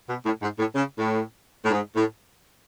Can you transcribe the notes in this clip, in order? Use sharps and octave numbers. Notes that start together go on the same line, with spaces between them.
B2
A2
G#2
A2
C#3
A2
A2
G#2
A2